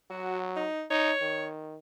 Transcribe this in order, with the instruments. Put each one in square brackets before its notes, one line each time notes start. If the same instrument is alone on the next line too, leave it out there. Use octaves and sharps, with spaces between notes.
[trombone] F#3 [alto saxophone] F#4
[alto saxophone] D#4
[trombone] D#4 [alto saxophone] C#5
[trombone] D#3